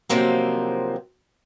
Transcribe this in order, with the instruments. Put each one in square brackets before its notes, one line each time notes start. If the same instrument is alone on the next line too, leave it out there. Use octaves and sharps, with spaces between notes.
[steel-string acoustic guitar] C3 D#3 F3 F#3 A#3 C4